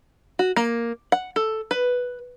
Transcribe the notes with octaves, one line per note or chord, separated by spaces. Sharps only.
F#4
A#3
F#5
A4
B4